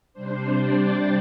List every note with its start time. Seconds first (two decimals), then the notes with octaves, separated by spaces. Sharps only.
0.13 C3 G3 D4 C5
0.56 D5